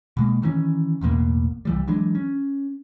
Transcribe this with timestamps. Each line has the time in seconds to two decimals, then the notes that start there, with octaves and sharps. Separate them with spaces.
0.17 B2 G#3 A#3
0.42 D#3 E3 G#3 C#4
1.01 A1 E2 B2 A#3
1.65 C2 E3 G3
1.87 E3 F#3 G#3 D4
2.15 C#4